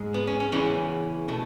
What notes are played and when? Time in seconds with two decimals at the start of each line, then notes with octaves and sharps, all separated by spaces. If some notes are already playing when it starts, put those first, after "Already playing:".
Already playing: G#2 G#3
0.14 B3
0.27 C#4
0.40 C#4
0.52 E2 C#3 E3 B3 C#4
1.28 B2 A3